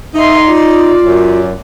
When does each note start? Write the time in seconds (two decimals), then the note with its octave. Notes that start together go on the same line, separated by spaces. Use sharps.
0.15 D#4 D#5 E5 C6
0.47 F4 D5
1.03 F#2